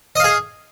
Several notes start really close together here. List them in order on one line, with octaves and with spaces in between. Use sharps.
D#5 F5 G#4